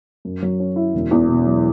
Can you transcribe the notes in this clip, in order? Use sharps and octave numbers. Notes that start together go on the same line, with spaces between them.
F#2
F#3
C#4
E4
E1
E2
B2
F#3